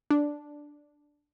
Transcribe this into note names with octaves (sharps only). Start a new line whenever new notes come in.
D4